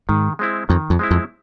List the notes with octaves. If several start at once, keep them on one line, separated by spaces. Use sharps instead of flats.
G#2 D#3
G#3 C4 E4
F2 D#3
F2
G#3 C4 E4
F2